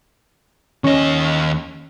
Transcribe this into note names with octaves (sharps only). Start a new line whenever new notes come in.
D#2 C#4 D#5 C#6